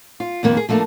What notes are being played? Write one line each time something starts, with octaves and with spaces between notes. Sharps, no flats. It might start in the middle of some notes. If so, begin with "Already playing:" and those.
F4
F2 D#3 A#3 B3
G#4
F3 A3 A#3 C#4 D4